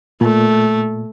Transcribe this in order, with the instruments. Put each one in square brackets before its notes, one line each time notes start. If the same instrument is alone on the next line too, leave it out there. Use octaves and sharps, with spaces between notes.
[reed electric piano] A#2 [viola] A3